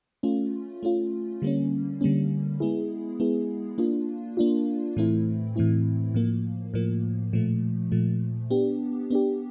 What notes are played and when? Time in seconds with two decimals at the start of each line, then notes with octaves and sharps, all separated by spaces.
0.23 A3 C#4 F4
0.83 A3 C#4 F4
1.42 D3 G3 A#3 C#4
2.01 D3 G3 A#3 C#4
2.60 G#3 B3 E4 G#4
3.20 G#3 B3 E4 G#4
3.78 A#3 D4 F4
4.37 A#3 D4 F4
4.96 A2 E3 A3 C4 E4
5.56 A2 E3 A3 C4 E4
6.14 A2 F3 A#3
6.74 A2 F3 A#3
7.33 A#2 F3 A3
7.92 A#2 F3 A3
8.50 B3 D4 G4
9.10 B3 D4 G4